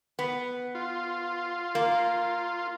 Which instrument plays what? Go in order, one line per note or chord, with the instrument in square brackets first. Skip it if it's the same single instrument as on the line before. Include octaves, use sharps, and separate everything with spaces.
[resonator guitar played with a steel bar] B3
[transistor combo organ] F4
[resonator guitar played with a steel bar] A#3